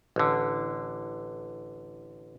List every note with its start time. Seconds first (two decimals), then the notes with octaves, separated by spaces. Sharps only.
0.16 A1 D3